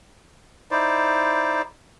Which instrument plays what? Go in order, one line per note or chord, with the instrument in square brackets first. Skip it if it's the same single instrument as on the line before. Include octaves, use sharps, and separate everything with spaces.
[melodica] D#4 E4 C5 D5